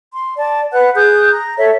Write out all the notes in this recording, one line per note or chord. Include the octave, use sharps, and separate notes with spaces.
C6
D5 A5
B4 F#5 F#6
G#4 D#6 F#6 G6
A#5
A4 C#5 E5